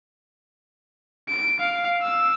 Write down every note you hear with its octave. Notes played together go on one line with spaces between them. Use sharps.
D7
F5
E6